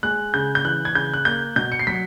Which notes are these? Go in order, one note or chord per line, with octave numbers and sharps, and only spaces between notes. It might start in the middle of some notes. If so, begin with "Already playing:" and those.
G#3 F#6
C#3 G6
G6
E3 F#6
G#6
C#3 G6
F#6
A#3 G6
B2 G6
C#7
C7
F#3 B6